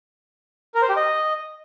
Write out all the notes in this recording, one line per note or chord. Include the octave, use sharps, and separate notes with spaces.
A#4
C5
G4
D#5